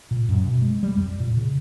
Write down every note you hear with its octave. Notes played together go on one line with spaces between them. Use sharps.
A#2
F#2
B2
G#3
G3
F2
A#2
C#3